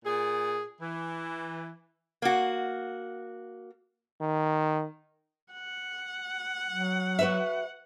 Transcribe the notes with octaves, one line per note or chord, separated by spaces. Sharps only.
A#2 G#4
E3
A#3 F#4
D#3
F#5
F#3
F#4 B4 E5